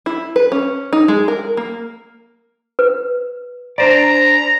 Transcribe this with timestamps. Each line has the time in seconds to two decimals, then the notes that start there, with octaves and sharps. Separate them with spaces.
0.06 E4
0.36 B4
0.52 C#4
0.93 D#4
1.08 G#3
1.28 A#4
1.57 A#3
2.79 B4
3.78 D4 C5 D5 A#5